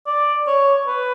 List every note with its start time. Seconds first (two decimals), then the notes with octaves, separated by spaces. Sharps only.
0.07 D5
0.47 C#5
0.87 B4